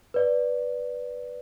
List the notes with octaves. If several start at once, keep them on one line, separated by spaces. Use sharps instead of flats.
B4 D5